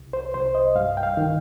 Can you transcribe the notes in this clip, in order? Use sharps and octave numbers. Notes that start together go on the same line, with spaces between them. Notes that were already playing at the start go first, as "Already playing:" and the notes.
Already playing: C2
C5
C2 C5
D#5
G2 F5
G5
F5
D#3